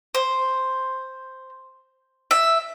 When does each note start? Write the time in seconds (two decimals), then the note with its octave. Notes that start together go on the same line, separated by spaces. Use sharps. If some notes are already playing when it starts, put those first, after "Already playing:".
0.15 C5
2.31 E5